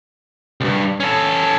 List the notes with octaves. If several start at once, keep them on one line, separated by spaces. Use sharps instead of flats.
C2 G2
C#4 A4